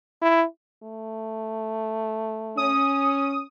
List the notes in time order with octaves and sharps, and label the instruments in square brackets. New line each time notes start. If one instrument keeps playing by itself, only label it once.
[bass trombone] E4
[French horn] A3
[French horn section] C#4 [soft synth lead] D#6